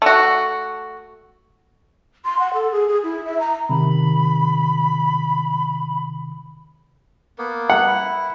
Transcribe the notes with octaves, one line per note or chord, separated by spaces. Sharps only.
A3 F#4
C6
F#5
A4
G#4
G#4
E4
E5
A#5
C3 D#3 B5
A#3 B3
F#5
E4